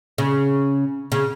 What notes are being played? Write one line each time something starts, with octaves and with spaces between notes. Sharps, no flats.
C#3
C#3